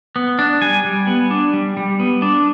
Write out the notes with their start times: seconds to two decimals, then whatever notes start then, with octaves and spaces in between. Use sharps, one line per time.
0.16 B3
0.39 D4
0.62 G3 G#5
0.84 G3
1.07 B3
1.30 D4
1.54 G3
1.77 G3
2.00 B3
2.22 D4